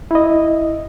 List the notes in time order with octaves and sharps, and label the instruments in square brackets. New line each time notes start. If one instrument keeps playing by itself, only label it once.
[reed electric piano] E4 D#5